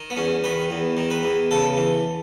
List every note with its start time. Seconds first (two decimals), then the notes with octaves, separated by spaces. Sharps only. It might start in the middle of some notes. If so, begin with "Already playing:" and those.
Already playing: D#3
0.10 B3
0.17 E2 C#4
0.44 D#3 B4
0.70 E2
0.97 D#3
1.10 B4
1.23 E2
1.51 C#3 A4
1.77 E3